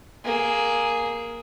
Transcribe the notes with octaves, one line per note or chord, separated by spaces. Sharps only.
A#3 G#4